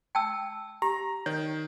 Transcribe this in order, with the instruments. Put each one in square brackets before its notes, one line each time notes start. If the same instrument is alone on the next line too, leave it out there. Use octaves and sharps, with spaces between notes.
[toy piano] G5 A5 E6
[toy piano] G4 [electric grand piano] A#5
[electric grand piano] D#3 [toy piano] C#5